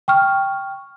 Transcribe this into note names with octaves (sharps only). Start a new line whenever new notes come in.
G5 C#6 F6